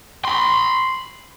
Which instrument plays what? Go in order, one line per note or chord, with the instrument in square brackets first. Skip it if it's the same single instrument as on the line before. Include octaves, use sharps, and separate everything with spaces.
[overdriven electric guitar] B5 C6